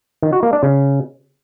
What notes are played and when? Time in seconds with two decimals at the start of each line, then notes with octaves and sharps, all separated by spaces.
0.23 D#3
0.33 F#4
0.43 A#3
0.53 D4
0.63 C#3